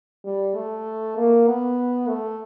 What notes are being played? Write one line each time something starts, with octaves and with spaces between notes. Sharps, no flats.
G3
A3
A#3
B3
A3